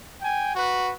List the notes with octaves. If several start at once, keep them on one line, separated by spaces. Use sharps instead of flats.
G5 G#5
F#4 B4